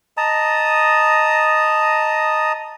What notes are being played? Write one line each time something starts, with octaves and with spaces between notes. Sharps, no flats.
D#5 A5 A#5 D#6